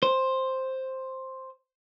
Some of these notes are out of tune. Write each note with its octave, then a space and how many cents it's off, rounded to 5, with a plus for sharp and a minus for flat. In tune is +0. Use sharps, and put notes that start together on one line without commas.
C5 +5